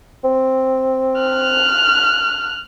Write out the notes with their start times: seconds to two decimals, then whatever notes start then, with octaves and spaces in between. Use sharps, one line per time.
0.24 C4
1.21 F6 F#6